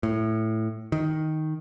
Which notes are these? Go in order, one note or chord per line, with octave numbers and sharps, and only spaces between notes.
A2
D#3